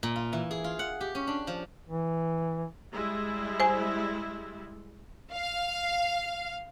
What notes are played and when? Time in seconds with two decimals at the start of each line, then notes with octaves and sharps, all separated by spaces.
0.03 A#2
0.16 F4
0.33 E3
0.51 G#4
0.64 F4
0.79 F#5
1.01 G4
1.15 C#4
1.27 D4
1.47 F3
1.89 E3
2.92 G3 G#3 E4
3.60 C5 G#5
5.33 F5